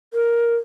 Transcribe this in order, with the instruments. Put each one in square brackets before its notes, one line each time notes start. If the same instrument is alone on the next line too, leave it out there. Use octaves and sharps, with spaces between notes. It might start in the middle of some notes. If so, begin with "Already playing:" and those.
[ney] A#4